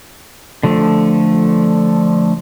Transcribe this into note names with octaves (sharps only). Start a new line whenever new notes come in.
D3 F3 A3